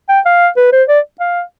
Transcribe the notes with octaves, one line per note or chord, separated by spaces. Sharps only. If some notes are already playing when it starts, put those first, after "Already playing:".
G5
F5
B4
C5
D5
F5